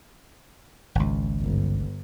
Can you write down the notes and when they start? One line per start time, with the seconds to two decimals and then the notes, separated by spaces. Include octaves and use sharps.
0.95 G#1 C#2
1.41 G1